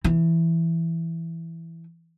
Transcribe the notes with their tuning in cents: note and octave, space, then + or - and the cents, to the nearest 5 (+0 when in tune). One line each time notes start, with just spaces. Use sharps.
E3 +5